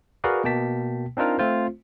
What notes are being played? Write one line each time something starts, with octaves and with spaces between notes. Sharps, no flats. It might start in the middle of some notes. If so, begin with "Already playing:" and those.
F#4 G#4 A#4 B4 D5 F5
B2 A#3 G5 A5 B6
C4 D4 D#4 F4 A#4
A3 C4 F4 C5